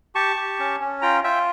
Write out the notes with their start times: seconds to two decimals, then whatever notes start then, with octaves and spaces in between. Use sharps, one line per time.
0.15 G4 A5 C#6
0.36 G4
0.59 C#4
0.81 C#4
1.02 F4 G5 A#5
1.24 F4 E5 G5